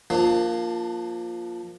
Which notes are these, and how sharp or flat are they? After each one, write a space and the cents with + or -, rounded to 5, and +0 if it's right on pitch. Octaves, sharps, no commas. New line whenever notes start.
F3 +0 A#3 +0 D4 +30